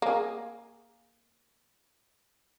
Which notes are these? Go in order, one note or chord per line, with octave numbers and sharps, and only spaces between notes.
A#3 G#4